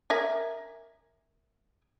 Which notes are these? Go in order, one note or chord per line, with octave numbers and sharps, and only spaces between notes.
A#4 E5 G#5